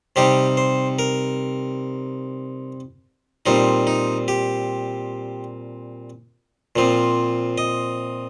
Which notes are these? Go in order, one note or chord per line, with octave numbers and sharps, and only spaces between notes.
C3 G3 C4 D#4 G4
C5
A#4
A#2 G3 C4 D#4
D#4
G4
A#2 F3 C4
D#5